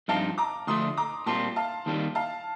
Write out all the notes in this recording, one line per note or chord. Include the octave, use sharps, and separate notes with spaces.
G2 F3 C4 D#4 G4 F5 A5
A#5 D6
D2 D3 F3 A3 C6 D#6
A#5 D6
A#2 G3 C4 F4 A5 C6
F5 A5
D#2 D#3 G3 C4 F4
F5 A5